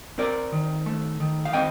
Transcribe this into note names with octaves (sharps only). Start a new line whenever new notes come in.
C4 A#4 D5
D#3
A3
D#3
F5
C4 D#5 G5